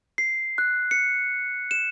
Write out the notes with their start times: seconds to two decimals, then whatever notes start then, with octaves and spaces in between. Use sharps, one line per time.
0.18 C7
0.58 F#6
0.91 C#7
1.71 E7